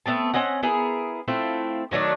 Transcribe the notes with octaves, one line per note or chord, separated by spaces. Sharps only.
A3 B3 C4 A5
C4 C#4 D#5 F#5
B3 E4 G#4 A#4
A3 C4 E4 F4
D#3 F#3 A3 D4